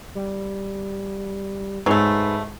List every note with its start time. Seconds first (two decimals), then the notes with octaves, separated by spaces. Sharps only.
0.15 G3
1.86 G#2 F#3 A3 B4